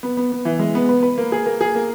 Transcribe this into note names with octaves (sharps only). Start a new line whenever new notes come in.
B3
B3
B3
E3
G#3
B3
B4
B4
A#3
G#4
A#3
G#4
A#3